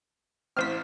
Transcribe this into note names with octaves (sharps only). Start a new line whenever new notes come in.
A1 C4 C5 F6 B6